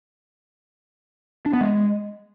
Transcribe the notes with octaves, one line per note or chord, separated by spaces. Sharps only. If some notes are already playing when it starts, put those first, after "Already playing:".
D4
B3
G#3